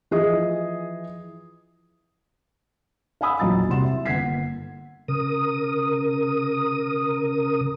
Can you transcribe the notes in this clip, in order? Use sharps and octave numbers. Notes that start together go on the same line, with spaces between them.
E3 F3 G#4 D#5
F5 F#5 G#5 B5 D#6 E6
A#1 E2 F#3 D#5 A#5 A6
C2 C3 F#5 C6 E7
E5
G1 A#3 F#5 G#6 B6 C7
C#3 A#4 D#6